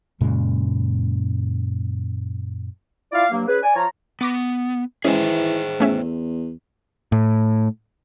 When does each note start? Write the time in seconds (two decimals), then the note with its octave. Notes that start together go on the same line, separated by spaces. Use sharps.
0.21 F#2 A#2 C#3 G#3
3.12 E4 F4 D5 F5
3.31 G2 F#3 A#3
3.47 C#4 G#4 B4
3.63 D5 G#5
3.76 F3 F4 C#5 A#5
4.21 B3 C#6 D6 A#6
5.05 E3 G#3 C#4 G#4 C5 G5
5.80 E2 A3 C#4 E5
7.12 A2